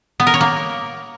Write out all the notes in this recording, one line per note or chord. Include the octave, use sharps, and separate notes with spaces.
B3
A#4
C#5
A#3